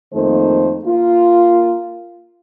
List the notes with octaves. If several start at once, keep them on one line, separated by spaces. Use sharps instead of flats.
F2 D#3 A3 A#3 D#4 C5
A#3 F4